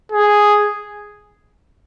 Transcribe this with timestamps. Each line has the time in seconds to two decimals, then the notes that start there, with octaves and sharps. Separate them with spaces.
0.12 G#4